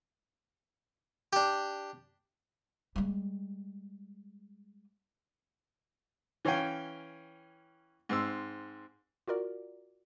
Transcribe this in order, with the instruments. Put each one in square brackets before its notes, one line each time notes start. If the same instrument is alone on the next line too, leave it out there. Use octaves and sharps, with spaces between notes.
[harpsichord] D4 G4
[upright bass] G3 G#3
[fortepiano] E3 C#4 C#5 F5 G5
G#2 C4 E6
[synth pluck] F4 F#4 A#4 D5